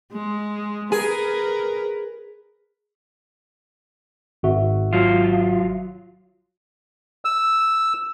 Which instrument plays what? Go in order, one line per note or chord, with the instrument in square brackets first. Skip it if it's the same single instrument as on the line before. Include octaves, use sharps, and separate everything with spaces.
[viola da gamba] G#3
[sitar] G#4 [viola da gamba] A#4 B4
[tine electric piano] G#1 F#4 E5
[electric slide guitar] F#3 F4
[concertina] E6